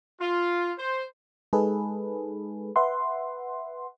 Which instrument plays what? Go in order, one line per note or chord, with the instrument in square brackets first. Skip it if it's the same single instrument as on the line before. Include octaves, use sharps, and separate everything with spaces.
[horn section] F4
C5
[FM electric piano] G#3 D#4 G#4 A4 B4
B4 E5 F#5 C6